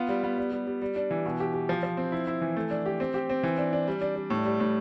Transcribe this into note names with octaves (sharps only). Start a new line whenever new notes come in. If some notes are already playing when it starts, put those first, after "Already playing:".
Already playing: B3 F4
G3
B3
G3
G3
G3
G3
D4
E3
B2
G4
G4
F3
F3
C4
E4
E4
E3
A3
D4
G4
C4
G4
C4
E3
D4
D4
G3
D4
G3
A2
G3
A2